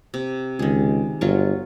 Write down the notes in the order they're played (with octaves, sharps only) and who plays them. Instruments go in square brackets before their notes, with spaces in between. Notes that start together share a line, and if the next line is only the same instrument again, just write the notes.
[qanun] C3
[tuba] C#2 [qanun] D#3 G#4
[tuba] G1 [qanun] F#3 F4 C#6